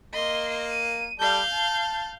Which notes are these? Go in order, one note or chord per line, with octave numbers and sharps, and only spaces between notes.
A#3 D#5 C6
D#7
G3 A4 D5 F5 G6
A5